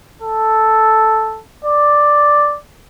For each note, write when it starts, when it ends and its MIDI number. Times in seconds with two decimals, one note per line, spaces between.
0.22 1.41 69
1.65 2.57 74